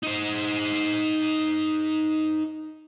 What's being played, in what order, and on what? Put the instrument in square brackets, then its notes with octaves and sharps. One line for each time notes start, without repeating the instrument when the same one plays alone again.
[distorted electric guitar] D#4 C5